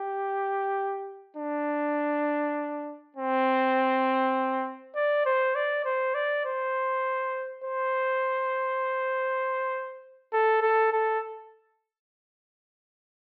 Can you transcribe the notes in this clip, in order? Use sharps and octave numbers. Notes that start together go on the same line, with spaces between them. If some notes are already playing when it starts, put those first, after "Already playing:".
Already playing: G4
D4
C4
D5
C5
D5
C5
D5
C5
C5
A4
A4
A4